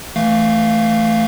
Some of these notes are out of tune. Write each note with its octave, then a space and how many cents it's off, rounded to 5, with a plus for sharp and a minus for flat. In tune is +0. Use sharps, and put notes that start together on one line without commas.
E3 +0 A3 +0 F5 +0